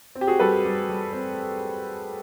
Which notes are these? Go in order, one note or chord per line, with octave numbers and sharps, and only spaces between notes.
C4
G4
F#4 G#4
G3 A4 B4
G3
G3
C4